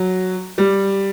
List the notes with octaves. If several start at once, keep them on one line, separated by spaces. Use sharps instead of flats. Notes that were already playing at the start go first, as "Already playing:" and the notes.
Already playing: F#3
G3